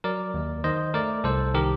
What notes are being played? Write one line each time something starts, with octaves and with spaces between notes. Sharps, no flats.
F#3 A#4 D5
D#2
D#3 C5 D#5
A3 A#4 D5
C2 A4 C5
D#3 G4 A#4